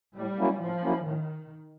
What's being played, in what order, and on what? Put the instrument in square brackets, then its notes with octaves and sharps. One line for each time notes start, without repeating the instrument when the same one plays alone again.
[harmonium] A2 [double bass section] G3
[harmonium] F#3 A#3 C#4 E4
[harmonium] A2 [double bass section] F3
[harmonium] F#3 A#3 C#4 E4
[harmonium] A2 [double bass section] D#3